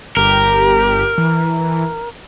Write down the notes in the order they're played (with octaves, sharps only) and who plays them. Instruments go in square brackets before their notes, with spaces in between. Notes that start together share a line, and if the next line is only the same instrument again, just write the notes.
[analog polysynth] G1 G4 [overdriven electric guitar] A#4
[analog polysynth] E3